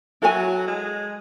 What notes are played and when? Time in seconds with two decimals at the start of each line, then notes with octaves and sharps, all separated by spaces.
0.22 F#3 E4 A4 C#5 G#5
0.67 G#3